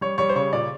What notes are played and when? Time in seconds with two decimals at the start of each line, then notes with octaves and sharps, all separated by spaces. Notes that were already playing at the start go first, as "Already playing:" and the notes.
0.01 G3 C#5
0.18 G3 C#5
0.29 C5
0.36 C#3 C#5
0.53 A#2 D5